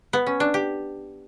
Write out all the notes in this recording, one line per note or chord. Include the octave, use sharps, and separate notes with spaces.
B3
C#4
D4
G4